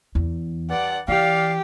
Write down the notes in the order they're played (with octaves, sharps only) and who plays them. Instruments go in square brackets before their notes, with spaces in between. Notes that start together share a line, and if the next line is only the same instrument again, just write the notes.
[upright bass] E2
[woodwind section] G2 D5 [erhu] F#5
[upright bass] E3 [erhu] G4 [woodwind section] D5 F5